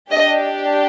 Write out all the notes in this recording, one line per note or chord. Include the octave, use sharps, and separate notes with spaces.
D4 G4 D#5